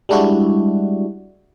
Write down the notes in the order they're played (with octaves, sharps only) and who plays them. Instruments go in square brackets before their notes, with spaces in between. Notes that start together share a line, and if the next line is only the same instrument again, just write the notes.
[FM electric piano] G3 G#3 D4 E4 F#4